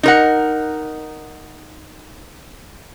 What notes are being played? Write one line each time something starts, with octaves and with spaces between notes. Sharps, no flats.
D#4 A#4 F#5